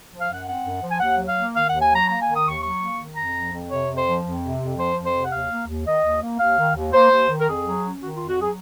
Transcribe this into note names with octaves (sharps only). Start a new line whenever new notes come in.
F3
F5
F#2 F#5
C4 F#5
F#2
F3
G#5
D#2 F#5
F#3
F5
A#3
D#3 F5
D#2 F#5
G#5
F#3 A#5
A#3 A#5
G#5
D#3
D#6
D#2 C#6
F#3 C#6
A#3
D#3
F2 A#5
F3
F2
C3 C#5
F2
C5
F3
F2
C3
F2
F3 C5
F2
C5
C3
F#5
D#2 F5
A#3
D#2
D#3 D#5
D#2
A#3
D#2 F5
D#3
D#2
A#3 C5
D#2
D#3
A#4
F2 G#4
F#3
C#4
D#3 F#4
F2 F4
F#4
F#3 G#4